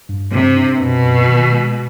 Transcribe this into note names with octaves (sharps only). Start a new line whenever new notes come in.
G2
G2 C3
D4
F#2 B2
F#2
D#3
G#3